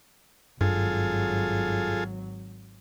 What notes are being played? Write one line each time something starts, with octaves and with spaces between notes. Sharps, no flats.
G#1 G2 F#3 F4 G#4 A4